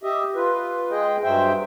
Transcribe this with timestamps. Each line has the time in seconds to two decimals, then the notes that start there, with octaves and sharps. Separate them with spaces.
0.03 G4 D#5 E5
0.35 F4 B4
0.91 G#3 G#4 D#5 G5
1.23 G2 F#3 C5 E5 G5